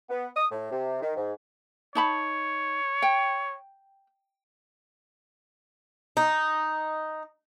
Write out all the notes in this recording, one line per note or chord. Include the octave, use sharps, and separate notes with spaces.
B3
D#6
A2
C3
D#3
G#2
D#4 C#5 A5 B5
G5
D#4